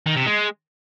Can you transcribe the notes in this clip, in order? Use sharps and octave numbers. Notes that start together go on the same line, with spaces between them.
D#3
C3
G#3